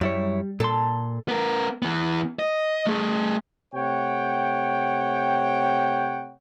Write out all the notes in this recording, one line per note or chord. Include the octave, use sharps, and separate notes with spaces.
F#2 G3 E4 C#5
A#2 A4 C6
B3 A#4
E3 B3
D#5
A3 G#4
C3 A3 C#5 F#5 G5